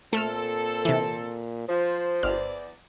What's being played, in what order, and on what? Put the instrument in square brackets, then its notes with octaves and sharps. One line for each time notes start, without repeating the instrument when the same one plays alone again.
[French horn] A#2 [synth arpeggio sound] A3 E6 F6 [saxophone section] C4 A4
[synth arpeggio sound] C3 E3
[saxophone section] F3 [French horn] C5
[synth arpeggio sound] G1 F6 [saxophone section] E2 D5